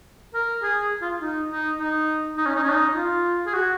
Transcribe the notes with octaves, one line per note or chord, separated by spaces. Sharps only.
A#4
G#4
F4
D#4
D#4
D#4
D#4
C#4
D#4
C#4
D#4
F4
G#4
F#4